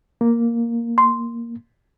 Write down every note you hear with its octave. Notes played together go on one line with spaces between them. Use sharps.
A#3
C6